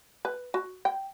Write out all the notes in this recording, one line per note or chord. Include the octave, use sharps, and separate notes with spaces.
B4
F#4
G5